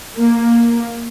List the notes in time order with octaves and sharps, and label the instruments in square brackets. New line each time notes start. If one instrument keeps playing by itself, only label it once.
[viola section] A#3